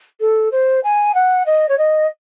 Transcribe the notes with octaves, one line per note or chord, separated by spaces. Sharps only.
A4
C5
G#5
F#5
D#5
C#5
D#5